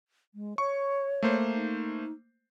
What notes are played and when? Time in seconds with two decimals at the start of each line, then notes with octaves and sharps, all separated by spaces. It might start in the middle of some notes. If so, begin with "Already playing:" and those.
0.34 G#3
0.58 C#5 C#6
1.23 A3 A#3 C5
1.54 D#4